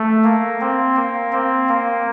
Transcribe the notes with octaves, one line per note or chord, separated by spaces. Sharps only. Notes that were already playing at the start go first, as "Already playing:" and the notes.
Already playing: A3
A#3
C4
A#3
C4
A#3